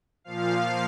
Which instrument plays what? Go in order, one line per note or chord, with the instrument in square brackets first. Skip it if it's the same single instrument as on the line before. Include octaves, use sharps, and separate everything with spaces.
[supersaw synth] A#2 F3 F5